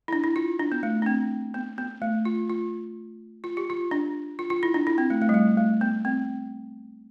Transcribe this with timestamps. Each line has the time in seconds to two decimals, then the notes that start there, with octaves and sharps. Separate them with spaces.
0.08 E4
0.13 D4
0.24 E4
0.36 F4
0.59 D4
0.72 B3
0.83 A3
1.02 D4
1.06 C4
1.54 B3
1.78 B3
2.02 A3
2.25 F4
2.50 F4
3.44 F4
3.57 G4
3.70 F4
3.91 D4
4.39 F4
4.50 F4
4.63 E4
4.74 D4
4.87 E4
4.98 C4
5.10 A3
5.22 A3
5.29 G3
5.34 A3
5.57 A3
5.81 B3
6.05 C4